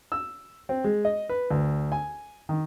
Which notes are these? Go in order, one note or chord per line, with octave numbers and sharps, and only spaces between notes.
E6
C4
G#3
D#5
B4
D2
G#5
D#3